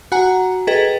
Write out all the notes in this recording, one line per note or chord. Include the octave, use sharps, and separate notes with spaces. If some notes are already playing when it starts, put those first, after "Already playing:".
F#4 F#5 G#5 A#5
G#4 A4 B4 D#5 G5